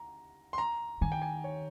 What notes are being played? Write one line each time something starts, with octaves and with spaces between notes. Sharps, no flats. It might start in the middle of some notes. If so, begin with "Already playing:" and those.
Already playing: A#5
C6
A#5
D#3 G#5
G5
G#5
C#5